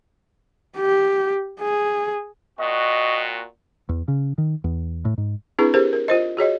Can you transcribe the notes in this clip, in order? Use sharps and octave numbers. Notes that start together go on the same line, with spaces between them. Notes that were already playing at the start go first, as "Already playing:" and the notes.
G4
G#4
A#2 C4 F#4 D#5
E2
C#3
D#3
E2
A2
G#2
C4 D4 E4 G#4 B4
G4 G#4 A#4 C5
A#4
F4 C5 D#5
F#4 G#4 C#5 D#5